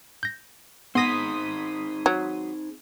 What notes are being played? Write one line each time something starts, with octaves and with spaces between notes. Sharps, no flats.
G6 A#6
B3 C4 D#4 G#4 C6 D#6 A#6 B6
F#3